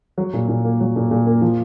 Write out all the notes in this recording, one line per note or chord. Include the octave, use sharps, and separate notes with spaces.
F#3
A#2
A#2
A#3
F#3
A#2
A#2
A#3
F3